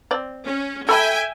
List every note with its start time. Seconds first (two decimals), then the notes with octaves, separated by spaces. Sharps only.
0.11 C4 D5
0.44 C#4
0.89 A4 E5 G5 G#5 B5